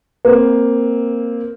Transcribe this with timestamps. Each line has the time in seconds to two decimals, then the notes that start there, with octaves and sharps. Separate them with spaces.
0.25 A#3 C4